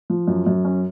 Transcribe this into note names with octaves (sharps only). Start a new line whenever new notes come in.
F3
F#2
F#2
C#4